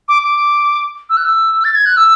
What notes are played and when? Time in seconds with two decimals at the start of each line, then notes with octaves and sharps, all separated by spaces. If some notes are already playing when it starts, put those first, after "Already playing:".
0.08 D6
0.23 D6
1.10 E6
1.17 F#6
1.25 E6
1.64 A6
1.75 G#6
1.86 F#6
1.97 E6